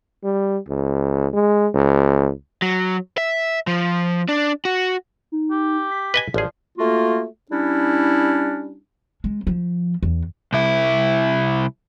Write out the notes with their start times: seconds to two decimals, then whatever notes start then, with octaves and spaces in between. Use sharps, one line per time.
0.24 G3
0.68 C#2
1.34 G#3
1.74 C#2
2.62 F#3
3.18 E5
3.67 F3
4.29 D4
4.65 F#4
5.32 D#4
5.51 G4
5.91 B6
6.14 B4 D#5 G#5
6.34 A1 F3 G#4 D5
6.78 A3 A#3 F4 F#4
7.51 G3 C#4 D4 E4
9.24 G#3
9.47 F3
10.03 E2
10.53 C2 E4